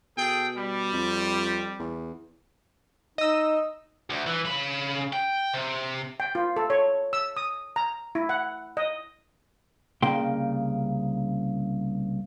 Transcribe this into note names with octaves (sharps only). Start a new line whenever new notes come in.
B2 G#4 A4 G5
G3
F2
E2
D#4 D#5 E6
D2
E3
C#3 B5
G5
C3
G5
F4
A4
C#5
E6
D#6
A#5
E4
F#5
D#5
C2 C#3 A#3 G5 C6